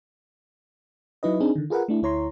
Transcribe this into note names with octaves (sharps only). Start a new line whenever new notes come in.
F#3 D#4 E4 B4 D#5
C4 D4 D#4 G#4
D3 D#3
F4 G#4 A#4 B4 F#5
A3 D4 E4
D2 E4 C#5 A#5 C6